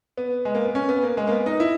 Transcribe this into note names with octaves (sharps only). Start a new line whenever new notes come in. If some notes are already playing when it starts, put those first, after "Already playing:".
B3
G#3
A#3
B3
C#4
B3
A#3
G#3
A#3
B3
D#4
E4